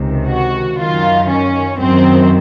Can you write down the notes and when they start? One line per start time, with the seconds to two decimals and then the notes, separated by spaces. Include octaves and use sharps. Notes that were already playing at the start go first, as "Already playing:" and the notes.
Already playing: C#2 C3 D#3
0.28 F#4
0.78 F#2 D#3 F4
1.28 C#4
1.78 F#2 D#3 C4